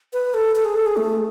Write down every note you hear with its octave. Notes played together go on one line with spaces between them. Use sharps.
B4
A4
A4
G#4
A4
G#4
A3